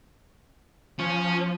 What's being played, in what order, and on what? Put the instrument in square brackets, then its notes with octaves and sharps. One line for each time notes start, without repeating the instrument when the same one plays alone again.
[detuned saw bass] F3 [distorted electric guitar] C#4